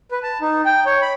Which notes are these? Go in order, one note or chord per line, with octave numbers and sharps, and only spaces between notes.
B4
A5
D#4
G5
C#5
B5